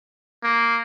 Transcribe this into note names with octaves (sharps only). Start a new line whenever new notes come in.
A#3